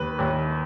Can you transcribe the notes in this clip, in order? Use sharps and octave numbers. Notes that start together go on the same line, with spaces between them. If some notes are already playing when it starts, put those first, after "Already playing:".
Already playing: D#2 B4
D#2